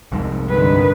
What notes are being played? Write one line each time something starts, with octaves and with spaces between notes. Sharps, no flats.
C2 F2 G#2
G2 D3 D#3 B4